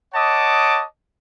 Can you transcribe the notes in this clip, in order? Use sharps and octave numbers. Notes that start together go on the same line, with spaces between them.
C#5 D#5 F#5 A5 D6 D#6